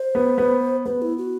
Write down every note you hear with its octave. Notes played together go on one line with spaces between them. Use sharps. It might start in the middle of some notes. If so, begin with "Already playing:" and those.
Already playing: C5
B3
B3
B3 B4
E4
F#4